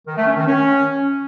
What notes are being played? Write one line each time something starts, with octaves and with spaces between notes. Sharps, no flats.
D#3
A3
C#4
D#3
C#4